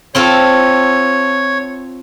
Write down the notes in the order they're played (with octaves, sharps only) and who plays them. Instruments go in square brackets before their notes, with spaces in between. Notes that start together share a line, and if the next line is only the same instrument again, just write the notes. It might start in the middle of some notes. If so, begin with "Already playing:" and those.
[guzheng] C4 F4 A4 [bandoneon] C#5